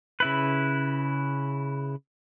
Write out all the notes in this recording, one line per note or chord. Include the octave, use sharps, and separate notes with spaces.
C#3 E4 B4